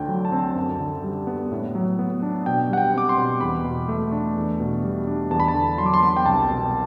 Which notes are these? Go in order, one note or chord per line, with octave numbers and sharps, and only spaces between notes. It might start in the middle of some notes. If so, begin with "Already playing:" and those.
Already playing: D2 D3 G5
F#3
A5
C4
F#2
D3
G3
B3
A2
F#3
B3
D4
B2 G5
G3 F#5
G5
C4 D6
C6
B2
E2 B5
B2
A3
D4
E2
B2
G3
D4
E2 A5
B5
A5
D3
F#3 C6
D6
C6
B3
G5
C2 A5
B2